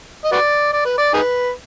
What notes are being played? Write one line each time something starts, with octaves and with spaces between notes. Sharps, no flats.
D#5
F#4 B4 D5
D5
B4
D5
D#4 G#4 B4